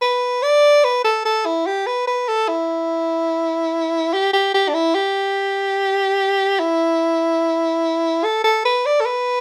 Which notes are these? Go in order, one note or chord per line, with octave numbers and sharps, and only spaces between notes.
B4
D5
B4
A4
A4
E4
G4
B4
B4
A4
E4
G4
G4
G4
D4
E4
G4
E4
A4
A4
B4
D5
A4
B4